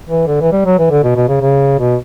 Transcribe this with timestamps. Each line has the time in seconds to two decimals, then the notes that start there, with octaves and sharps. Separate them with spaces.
0.09 E3
0.27 D3
0.41 E3
0.52 G3
0.66 F#3
0.79 E3
0.91 D3
1.03 B2
1.16 B2
1.29 C#3
1.41 C#3
1.79 B2